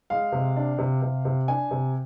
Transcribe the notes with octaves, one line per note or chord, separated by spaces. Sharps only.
G#3 F5
C3
D4
C3
C3
C3
D4 G#5
C3